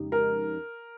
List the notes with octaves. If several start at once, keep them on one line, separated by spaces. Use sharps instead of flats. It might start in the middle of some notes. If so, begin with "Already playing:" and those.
Already playing: F2 C#3 G#3 D#4 G4
A#4